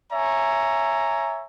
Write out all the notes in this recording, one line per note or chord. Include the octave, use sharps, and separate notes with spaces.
C#5 E5 G#5 A#5